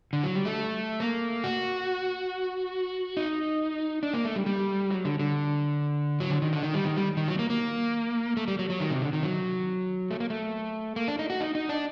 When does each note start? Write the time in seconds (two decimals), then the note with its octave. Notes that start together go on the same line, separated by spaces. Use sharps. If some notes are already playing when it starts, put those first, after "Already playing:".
0.13 D3
0.23 F#3
0.35 G3
0.45 A3
1.00 A#3
1.44 F#4
3.17 D#4
4.03 D4
4.14 A#3
4.25 A3
4.36 G3
4.46 G3
4.91 F#3
5.05 D3
5.19 D3
6.20 F#3
6.30 D3
6.42 D#3
6.53 D3
6.63 D#3
6.74 G3
6.85 D#3
6.96 G3
7.17 D#3
7.28 F#3
7.39 A#3
7.50 A#3
8.37 A3
8.48 G3
8.59 F#3
8.70 F#3
8.80 D#3
8.90 C3
9.02 D3
9.13 D#3
9.23 F#3
10.11 A3
10.20 A#3
10.30 A3
10.96 A#3
11.08 D4
11.19 D#4
11.30 F#4
11.41 D#4
11.55 D#4
11.69 D4